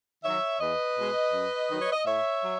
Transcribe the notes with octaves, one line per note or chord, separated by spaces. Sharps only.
D#3 F#3 C#5 E5
E2 B4 D#5
B2 G#3
F#2
D#3 F#3
C#5
D#5
A2 C#5 E5
F#3